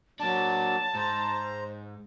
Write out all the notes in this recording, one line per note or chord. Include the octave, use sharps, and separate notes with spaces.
F#3 A#3 D4 A5
G#2 C5 A#5